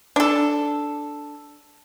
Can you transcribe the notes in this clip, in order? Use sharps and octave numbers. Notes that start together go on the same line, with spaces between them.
D4 A4